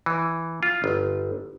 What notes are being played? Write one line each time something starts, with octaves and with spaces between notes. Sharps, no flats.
E3
F4
G1